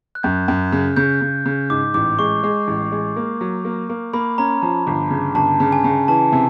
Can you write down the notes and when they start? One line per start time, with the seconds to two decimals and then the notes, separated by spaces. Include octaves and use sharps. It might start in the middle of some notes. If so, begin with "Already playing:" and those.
0.15 F#6
0.23 F#2 G6
0.48 F#2
0.72 C#3
0.97 C#3 G6
1.22 C#3
1.46 C#3
1.70 G#2 D6
1.94 A1 D6
2.19 G#3 C#6
2.43 G#3
2.68 A1
2.92 G#3
3.16 A#3
3.41 F#3
3.65 A#3
3.89 A#3
4.13 A#3 B5
4.38 C#4 A#5
4.62 F3 A5
4.87 G1
5.11 C#3
5.35 G1 A5
5.60 C#3
5.72 G#5
5.84 C#3
6.08 E3 A5
6.32 C3